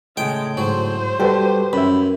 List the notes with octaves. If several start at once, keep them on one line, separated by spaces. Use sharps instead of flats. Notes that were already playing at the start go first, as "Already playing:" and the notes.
A2 C#3 G#3 G5
G#2 F#3 C5
G3 F#4 G4 A4 B4
F#2 E5 B5